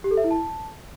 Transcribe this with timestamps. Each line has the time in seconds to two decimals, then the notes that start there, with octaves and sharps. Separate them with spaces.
0.04 G4
0.11 A4
0.17 E5
0.24 E4
0.31 A5